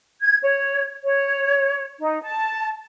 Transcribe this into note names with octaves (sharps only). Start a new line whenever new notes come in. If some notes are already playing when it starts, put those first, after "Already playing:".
G#6
C#5
C#5
D#4
A5